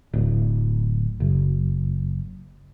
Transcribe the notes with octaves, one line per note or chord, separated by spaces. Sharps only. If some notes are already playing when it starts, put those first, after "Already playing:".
D1
F#1